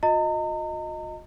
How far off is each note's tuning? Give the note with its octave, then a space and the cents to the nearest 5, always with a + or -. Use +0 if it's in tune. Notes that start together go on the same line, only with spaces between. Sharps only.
F4 +45 D#5 +0 A#5 -40